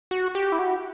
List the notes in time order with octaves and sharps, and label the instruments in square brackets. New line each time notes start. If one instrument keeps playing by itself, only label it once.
[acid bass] F#4
G4
E4
F#4